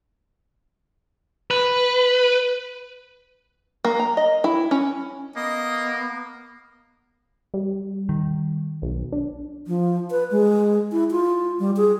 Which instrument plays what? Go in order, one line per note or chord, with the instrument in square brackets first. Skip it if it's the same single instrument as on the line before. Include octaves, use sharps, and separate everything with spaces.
[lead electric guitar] B4
[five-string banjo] A#3
A#5
D#5
E4
C#4
[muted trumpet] A#3 [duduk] B3 [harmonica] D#5
[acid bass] G3
[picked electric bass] D#3
[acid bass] B1
D4
[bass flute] F3
B4
G#3
E4
F4
G3
G#4